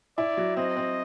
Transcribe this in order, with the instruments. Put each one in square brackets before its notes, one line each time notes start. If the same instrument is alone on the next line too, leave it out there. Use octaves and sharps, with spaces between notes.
[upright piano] E4 [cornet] D5
[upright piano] F#3
[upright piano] C4 [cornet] D#5
[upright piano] C4